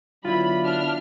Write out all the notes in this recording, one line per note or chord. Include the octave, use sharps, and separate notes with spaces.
D3 F#3 B3 E4 F4 D5 B5
D4 F6